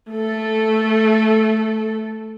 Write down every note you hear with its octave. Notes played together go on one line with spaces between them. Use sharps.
A3 A4